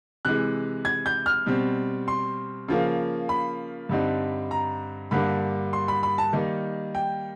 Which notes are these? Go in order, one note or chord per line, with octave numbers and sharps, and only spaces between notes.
C3 E3 G#3 F#6
G#6
G6
F6
B2 G3 C4
C6
C#3 F3 A#3
B5
G2 D3 G3 C4 D#4
A#5
G2 D3 G3 A#3 B5
C6
B5
B5
A5
D#3 G3 A#3 D#4
G5